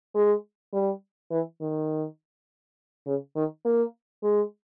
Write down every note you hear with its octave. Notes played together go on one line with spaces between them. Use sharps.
G#3
G3
E3
D#3
C#3
D#3
A#3
G#3